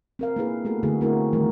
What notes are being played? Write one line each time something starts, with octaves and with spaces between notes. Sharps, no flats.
C4 A#4 F5
A#3 C4 D4 E4 G#4 B4
A3 B3 F#4 G#4 A4
D3 A3 D#4 E4 F#4 G#4
A3 C4 D4 E4 F#4 A#4
A#2 D#3 E3 G3 A3 A#4